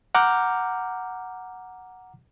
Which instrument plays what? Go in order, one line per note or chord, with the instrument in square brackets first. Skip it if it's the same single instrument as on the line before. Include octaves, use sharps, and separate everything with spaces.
[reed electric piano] F#5 A#5 D6 F6 G6